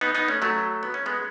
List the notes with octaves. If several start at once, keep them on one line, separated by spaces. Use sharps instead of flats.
B3 D#4
B3 D#4
A3 C#4
F#3 A3
B3
C#4
G#3 B3